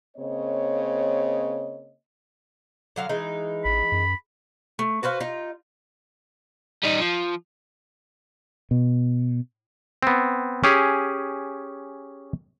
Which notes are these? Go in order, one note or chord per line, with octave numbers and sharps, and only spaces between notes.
C#3 A#3 C4 C#5 D#5
D3 F#3 F5
E3 G#3 D#4
A1 B5
F#2
A3
F#4 B4 C5 F5
D#4 F4
G3 D#4
F3
B2
B3 C4
C#4 G4 G#4